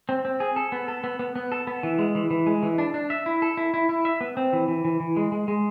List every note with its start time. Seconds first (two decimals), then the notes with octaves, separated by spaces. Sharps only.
0.09 C4
0.25 C4
0.40 G#4
0.56 A4
0.72 B3
0.88 A4
1.04 B3
1.19 B3
1.36 B3
1.52 A4
1.67 B3
1.83 E3
1.99 G#3
2.15 E3
2.31 E3
2.46 G#3
2.63 E3
2.78 D4
2.94 D4
3.10 E5
3.26 E4
3.42 A4
3.57 E4
3.74 E4
3.89 E4
4.05 E5
4.21 B3
4.37 C4
4.53 E3
4.68 E3
4.85 E3
5.00 E3
5.16 G#3
5.32 G#3
5.48 G#3